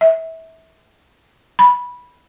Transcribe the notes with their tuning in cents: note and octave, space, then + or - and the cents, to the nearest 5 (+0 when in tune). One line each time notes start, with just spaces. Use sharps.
E5 -25
B5 -10